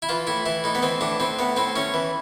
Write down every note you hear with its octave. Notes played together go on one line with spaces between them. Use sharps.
E4
E3 F4
A2 E4
E3 E4
A2 D#4
B3
E3 C4
A2 D4
A2 C4
A2 B3
A2 C4
A2 C#4
E3